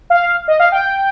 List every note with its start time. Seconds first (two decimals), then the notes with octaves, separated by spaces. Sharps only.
0.10 F5
0.48 D#5
0.60 F5
0.72 G5